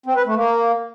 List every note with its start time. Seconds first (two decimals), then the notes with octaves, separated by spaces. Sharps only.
0.06 C4
0.16 B4
0.26 A3
0.36 A#3